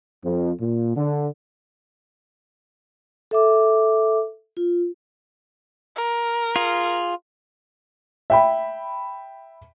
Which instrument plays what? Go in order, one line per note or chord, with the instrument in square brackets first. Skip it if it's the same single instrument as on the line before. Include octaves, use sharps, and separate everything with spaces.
[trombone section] F2
A#2
D3
[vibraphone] A4 E5 D6
F4
[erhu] A#4
[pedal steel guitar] F4 G#4
[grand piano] E5 G5 B5